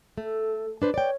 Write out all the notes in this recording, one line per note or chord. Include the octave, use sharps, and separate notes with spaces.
A3 A4
D4 B4 C5
C#5 D5 G5